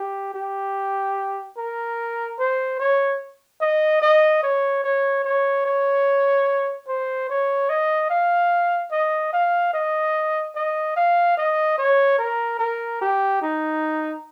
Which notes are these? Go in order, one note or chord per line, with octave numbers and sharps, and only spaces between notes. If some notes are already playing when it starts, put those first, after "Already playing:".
Already playing: G4
G4
A#4
C5
C#5
D#5
D#5
C#5
C#5
C#5
C#5
C5
C#5
D#5
F5
D#5
F5
D#5
D#5
F5
D#5
C#5
A#4
A#4
G4
D#4